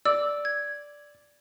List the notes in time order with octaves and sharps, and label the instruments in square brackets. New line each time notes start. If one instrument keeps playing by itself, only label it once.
[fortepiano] D5 [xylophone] E6
[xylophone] G#6